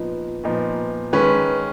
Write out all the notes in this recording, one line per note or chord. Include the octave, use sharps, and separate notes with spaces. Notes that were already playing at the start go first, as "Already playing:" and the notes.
Already playing: A#2 F3 B3 D#4
A#2 F3 B3 D#4
D#3 G#3 C#4 B4